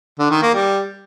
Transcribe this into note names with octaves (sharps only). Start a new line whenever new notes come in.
D3
D#3
A#3
G3